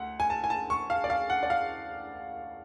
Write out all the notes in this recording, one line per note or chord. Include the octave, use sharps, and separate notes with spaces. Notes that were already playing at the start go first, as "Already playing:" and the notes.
Already playing: D2 F#5
G#5
A5
G#5
A5
C#6
F5
D5
F5
F#5
D5
F5